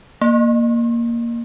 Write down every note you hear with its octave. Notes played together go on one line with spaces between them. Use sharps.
A#3